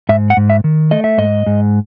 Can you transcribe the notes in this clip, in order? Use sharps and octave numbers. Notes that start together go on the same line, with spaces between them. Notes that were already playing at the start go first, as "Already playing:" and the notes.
G#2 E5
F#5
G#2
E5
D#3
A3 D#5
E5
G#2 D#5
G#2